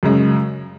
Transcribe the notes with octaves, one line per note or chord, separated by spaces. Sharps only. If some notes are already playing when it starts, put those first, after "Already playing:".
F#2 C#3 G#3